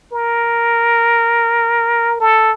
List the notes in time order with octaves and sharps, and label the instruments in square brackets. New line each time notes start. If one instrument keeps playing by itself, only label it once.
[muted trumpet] A#4
A4